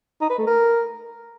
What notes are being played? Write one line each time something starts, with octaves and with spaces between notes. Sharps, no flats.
D#4
B4
A3
A#4